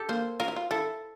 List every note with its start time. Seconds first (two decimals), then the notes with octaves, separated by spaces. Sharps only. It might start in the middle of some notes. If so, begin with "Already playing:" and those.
Already playing: G4 A4
0.09 A#3 C5
0.40 F4 A#4
0.48 E4
0.56 F4
0.71 E4 A4